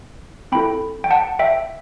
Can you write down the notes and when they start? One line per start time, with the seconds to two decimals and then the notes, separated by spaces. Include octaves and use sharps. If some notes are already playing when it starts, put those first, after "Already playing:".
0.52 C4 E4 A4 G5 B5
1.04 G5
1.11 F#5 A5
1.39 E5 G5